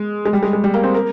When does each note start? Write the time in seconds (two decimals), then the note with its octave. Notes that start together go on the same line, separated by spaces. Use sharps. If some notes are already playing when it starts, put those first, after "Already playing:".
Already playing: G#3
0.26 G#3
0.33 G3
0.43 G#3
0.53 G#3
0.64 G3
0.74 A#3
0.83 C4
0.94 A#4